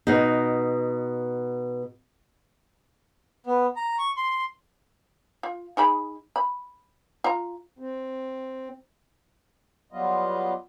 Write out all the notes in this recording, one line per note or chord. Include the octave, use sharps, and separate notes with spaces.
B2 D#4
B3
A#5
C#6
C6
F4
D#4 G#4 B5
B5
F4 A#5
C4
F#3 G3 B3 F4 D#5